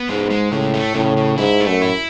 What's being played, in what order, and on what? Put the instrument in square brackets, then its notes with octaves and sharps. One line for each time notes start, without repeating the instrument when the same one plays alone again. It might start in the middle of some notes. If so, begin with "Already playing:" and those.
Already playing: [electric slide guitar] B3
[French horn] G#2 [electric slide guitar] G#3
[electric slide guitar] G#3
[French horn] A2 [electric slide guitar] C#3
[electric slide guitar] A3
[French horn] A2 [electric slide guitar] C#3
[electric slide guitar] C#3
[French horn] G#2 [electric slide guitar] E4
[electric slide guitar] A3
[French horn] F#2
[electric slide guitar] E4